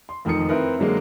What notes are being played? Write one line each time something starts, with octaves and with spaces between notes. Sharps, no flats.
C6
F1 D#3 F3 A#4 D#6 C#7
C4 E4 A#4 B4
D3 F#3 G#3 A#3